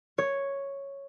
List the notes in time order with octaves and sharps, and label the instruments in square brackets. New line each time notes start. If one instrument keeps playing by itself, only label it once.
[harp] C#5